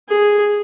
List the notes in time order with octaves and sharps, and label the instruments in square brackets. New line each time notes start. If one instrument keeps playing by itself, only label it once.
[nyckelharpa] G#4